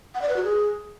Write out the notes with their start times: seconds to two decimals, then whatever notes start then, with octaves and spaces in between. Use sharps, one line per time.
0.15 F#5
0.22 D5
0.29 B4
0.36 F#4
0.44 G#4